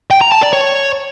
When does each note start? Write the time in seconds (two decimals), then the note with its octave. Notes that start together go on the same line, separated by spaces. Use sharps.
0.11 G5
0.21 A#5
0.32 A5
0.42 D5
0.53 C#5